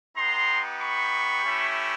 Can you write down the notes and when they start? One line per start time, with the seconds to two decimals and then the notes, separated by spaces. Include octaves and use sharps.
0.16 B3 D#4 G4 A#5 C6
0.80 B5 C#6
1.44 A3 C#4 E4 G4